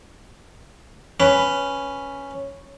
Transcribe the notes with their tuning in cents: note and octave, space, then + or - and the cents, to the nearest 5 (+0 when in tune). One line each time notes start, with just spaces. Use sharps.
C#4 +0 B4 +0